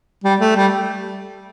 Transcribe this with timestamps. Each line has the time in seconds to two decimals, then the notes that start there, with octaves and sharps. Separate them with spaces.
0.24 G3
0.40 A3
0.56 G3